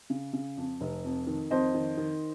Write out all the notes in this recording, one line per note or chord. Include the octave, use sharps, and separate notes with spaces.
C#3
C#3
F2
F1
F2
D#3
F2 C5 D#5
D#3
D#3